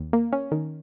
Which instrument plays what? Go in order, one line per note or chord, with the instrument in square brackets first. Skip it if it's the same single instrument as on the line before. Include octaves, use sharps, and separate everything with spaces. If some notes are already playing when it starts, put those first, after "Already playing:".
Already playing: [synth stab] D#2
A#3
C#4
D#3